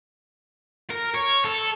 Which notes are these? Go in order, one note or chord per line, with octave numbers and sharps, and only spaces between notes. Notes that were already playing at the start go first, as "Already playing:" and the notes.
A#4
C#5
A4